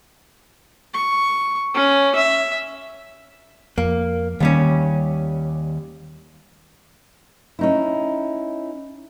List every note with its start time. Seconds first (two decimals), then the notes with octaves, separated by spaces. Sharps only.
0.94 C#6
1.74 C#4
2.15 E5
3.78 F2 A#3
4.40 D#2 D#3 G3 A#3 C#4
7.59 C#4 D#4 E4